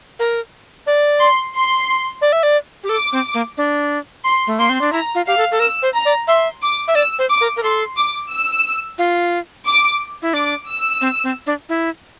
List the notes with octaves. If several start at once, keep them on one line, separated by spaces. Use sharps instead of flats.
A#4
D5
C6
C6
D5
E5
D5
G4
A4 D6
C4
A#3
D4
C6
A3
A#3 C6
C4
D4
E4 A#5
F4
G4 F5
A4
A4
A#4 E6
C5
A#5
D5
E5 C6
D6
E5
D5 E6
C5
D6
A#4
A#4
A4 C6
D6
E6
F4
D6
E4
D4 D6
E6
C4
C4
D4
E4